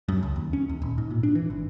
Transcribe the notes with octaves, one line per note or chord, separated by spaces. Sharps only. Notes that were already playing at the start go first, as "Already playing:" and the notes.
F#2
C#2
D#2
C#4
D#2
D#1
G#2
A#2
D4
E3
G#1